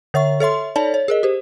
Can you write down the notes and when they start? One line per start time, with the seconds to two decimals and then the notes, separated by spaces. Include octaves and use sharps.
0.14 D3 C#5 E5 C#6
0.40 A4 C#5 E5 C6
0.76 D#4 A4 C#5 D5 A5
0.94 C#5
1.08 G#4 A#4 D#5
1.23 G4 C5